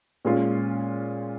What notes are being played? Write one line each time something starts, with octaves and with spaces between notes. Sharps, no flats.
A#2 G#3 C#4 F4